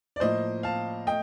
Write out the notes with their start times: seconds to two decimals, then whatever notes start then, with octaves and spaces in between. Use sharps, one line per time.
0.16 D5
0.20 A2 F3 A#3 C5 D#5
0.63 F5 A5
1.06 A3 D#5 G5